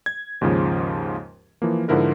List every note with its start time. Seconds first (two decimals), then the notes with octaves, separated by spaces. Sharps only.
0.06 G#6
0.41 D#2 G#2 C#3 F3
1.62 E3 F3 A#3
1.88 G#2 D3 F3 E4 A#4 B4